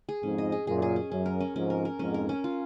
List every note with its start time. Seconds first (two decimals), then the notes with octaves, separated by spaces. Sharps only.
0.09 G#4
0.23 F2 G#2 C#4
0.38 D#5
0.52 G#4
0.67 F#2 A#2 G#4
0.82 G#4
0.96 C#4
1.11 F#2 C#4
1.26 A#4
1.40 C#4
1.56 F2 G#2 C#4
1.70 A#4
1.85 A#4
1.99 F2 G#2 C#4
2.14 A#4
2.29 C#4
2.44 F4